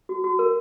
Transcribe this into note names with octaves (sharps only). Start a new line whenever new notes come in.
F#4
F#4
A#4